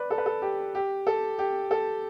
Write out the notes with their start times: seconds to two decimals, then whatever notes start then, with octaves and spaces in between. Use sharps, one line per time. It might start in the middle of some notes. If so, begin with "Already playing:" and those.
Already playing: B4 D5
0.11 A4
0.18 B4
0.26 A4
0.42 G4
0.75 G4
1.07 A4
1.39 G4
1.71 A4